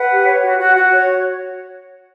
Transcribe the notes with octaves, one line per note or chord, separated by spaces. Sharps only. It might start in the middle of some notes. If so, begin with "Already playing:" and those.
Already playing: B4 F#5
G4
C#5
F#4
F#4
F#4
C#5